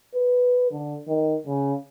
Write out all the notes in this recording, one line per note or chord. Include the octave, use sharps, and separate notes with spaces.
B4
D3
D#3
C#3